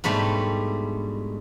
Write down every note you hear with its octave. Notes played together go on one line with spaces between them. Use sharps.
G#2 B2 G3 A3 D4